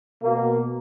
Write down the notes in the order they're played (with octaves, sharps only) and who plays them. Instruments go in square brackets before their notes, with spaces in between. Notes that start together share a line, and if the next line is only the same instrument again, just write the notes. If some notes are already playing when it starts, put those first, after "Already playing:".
[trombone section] B2 A#3